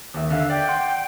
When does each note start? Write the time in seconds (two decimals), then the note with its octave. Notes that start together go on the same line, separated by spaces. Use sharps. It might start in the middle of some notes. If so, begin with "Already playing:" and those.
0.14 D#2 E5
0.30 D3 E5 F5
0.50 D5 G5
0.68 F#5 C6